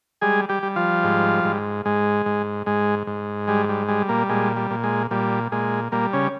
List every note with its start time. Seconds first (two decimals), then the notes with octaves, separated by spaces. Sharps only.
0.21 G3 G#3 G#4
0.49 G3 G4
0.63 G3
0.76 F3 F4
1.04 G#2
1.44 G#2
1.85 G#2 G#3
2.26 G#2
2.66 G#2 G#3
3.07 G#2
3.48 G3 G#3
3.69 G3
3.88 G3 G#3
4.09 A#2 A#3
4.29 A#2 G#3
4.57 G3
4.71 A#2
4.84 G#3
5.11 A#2 G3
5.52 A#2 G#3
5.92 A#2 G3 A#3
6.13 C#3 C#4